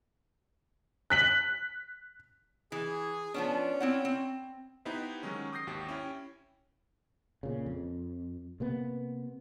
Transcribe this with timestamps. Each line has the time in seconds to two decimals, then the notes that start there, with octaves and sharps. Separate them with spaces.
1.10 F#6 B6 F#7
2.72 E3 G#4
3.34 F3 B3 C#4 D4
3.80 C4 E4 F#5
4.05 C4
4.85 B3 D#4 E4 G4 B4 C5
5.23 D#3 F#3 G#3 C#4
5.52 D6 D#6 G6 A#6 C7
5.67 G#1 D#2 F#4 G4
5.89 C#4 E4 G5
7.43 A#2 C#3
7.66 F2
8.60 C3 A#3 B3